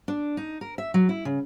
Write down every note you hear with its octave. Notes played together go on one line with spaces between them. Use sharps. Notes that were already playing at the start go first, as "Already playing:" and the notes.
D4
D#4
A#4
E5
F#3
E4
C#3